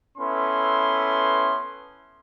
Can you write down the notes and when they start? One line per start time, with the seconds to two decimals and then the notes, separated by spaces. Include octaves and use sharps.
0.18 B3 C#4 E4 A4 B4 C6